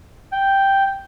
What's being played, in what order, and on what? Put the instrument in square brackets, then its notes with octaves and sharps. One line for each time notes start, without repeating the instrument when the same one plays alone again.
[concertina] G5